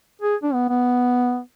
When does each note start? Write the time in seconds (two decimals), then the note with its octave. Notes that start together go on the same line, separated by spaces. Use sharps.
0.22 G#4
0.43 D4
0.54 B3
0.69 B3